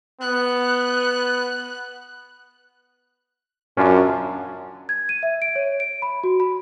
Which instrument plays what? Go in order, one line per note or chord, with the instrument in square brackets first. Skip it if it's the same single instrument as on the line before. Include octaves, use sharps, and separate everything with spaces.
[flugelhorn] B3 [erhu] F#6
[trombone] F#2 [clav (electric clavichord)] C#4 D4 F4
[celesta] G#6
D#7
E5
D7
C#5
D7
B5
F#4
B5